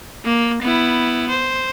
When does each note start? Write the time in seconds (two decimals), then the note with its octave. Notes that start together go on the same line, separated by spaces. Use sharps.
0.24 A#3
0.61 B3 E4
1.29 C5